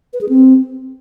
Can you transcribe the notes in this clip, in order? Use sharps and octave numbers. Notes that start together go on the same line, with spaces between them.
B4
G#4
C4